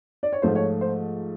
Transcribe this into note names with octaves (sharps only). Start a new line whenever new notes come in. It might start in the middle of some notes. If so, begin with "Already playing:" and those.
D5
C#5
G#2 F3 A3 C5
C#5
C5